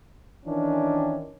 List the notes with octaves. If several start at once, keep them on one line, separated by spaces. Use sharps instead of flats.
D#3 E3 C#4 D4